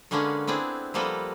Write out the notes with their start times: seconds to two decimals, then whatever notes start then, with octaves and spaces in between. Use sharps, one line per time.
0.11 D3 G#3 A#3 B3 C#4 D4
0.47 B3 C4 D4 E4 G#4
0.94 F3 G3 A#3 B3 A4 D#5